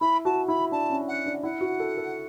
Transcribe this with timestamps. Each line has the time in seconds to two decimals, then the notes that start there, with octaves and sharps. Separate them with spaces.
0.01 E4 B5
0.25 F#4 A5
0.48 E4 B5
0.72 D4 A5
0.90 C#4
1.08 F#5
1.26 D4
1.43 E4 F#5
1.61 F#4
1.80 A4
1.98 A4